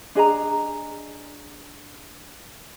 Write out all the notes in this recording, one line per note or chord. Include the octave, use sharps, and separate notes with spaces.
D4 G#4 D#5 A#5